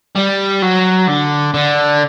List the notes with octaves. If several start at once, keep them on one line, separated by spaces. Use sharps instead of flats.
G3
F#3
D3
D3